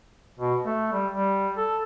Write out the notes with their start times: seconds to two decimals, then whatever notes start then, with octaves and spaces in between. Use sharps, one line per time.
0.39 B2
0.66 A3
0.92 G3
1.12 G3
1.57 A4